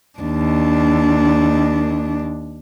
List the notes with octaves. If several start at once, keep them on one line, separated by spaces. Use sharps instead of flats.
D#2 D4